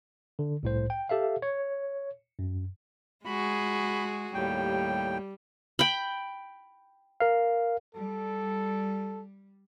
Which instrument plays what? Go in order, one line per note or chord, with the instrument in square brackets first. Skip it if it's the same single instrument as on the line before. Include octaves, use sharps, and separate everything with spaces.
[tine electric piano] D3
C2 A2 C5
G5
G4 A4 E5 F5
C#5
F#2
[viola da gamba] G#3 F#4 G#4 [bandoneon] B5
[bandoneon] D#2 A2 G5 [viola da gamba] G3
[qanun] G5 B5
[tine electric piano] A#4 F5
[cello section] G3 [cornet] A4